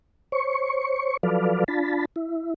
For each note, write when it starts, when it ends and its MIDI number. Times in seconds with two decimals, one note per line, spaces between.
0.32 1.17 72
0.32 1.17 73
0.32 1.17 85
1.23 1.64 53
1.23 1.64 54
1.23 1.64 69
1.23 1.64 71
1.23 1.64 74
1.23 1.64 77
1.68 2.05 62
1.68 2.05 65
1.68 2.05 81
1.68 2.05 83
2.16 2.54 64